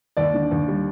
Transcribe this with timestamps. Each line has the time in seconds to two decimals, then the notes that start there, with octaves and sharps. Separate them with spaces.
0.17 D#2 D5
0.34 D3
0.51 D#2
0.68 G3